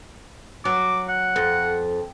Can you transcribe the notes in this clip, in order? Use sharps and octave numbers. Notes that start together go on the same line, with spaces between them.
F#3 D6
F#5
F2